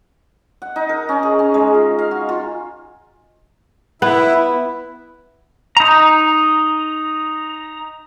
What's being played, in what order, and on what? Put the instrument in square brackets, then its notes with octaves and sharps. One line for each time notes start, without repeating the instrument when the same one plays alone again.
[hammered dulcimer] F#5
D#4
A#4
C#4
G#4
C#4
G#3
F4
F5
F#4
F4
[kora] B3 [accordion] E4
[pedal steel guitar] D#4 A#5